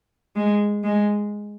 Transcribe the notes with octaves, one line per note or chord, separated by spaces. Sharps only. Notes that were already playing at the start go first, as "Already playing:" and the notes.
G#3
G#3